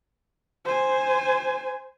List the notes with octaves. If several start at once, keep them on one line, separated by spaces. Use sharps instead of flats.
C5 G#5